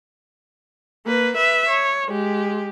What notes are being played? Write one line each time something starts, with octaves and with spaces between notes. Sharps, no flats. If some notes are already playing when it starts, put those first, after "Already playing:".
A#3 B4
B4 E5
C#5
G#3 G4